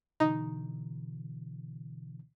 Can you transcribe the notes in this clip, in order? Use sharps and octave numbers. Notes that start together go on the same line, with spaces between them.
B2 D3 E3 D#4